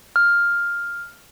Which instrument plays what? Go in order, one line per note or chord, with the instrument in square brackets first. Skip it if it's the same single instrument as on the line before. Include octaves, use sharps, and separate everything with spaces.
[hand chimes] F6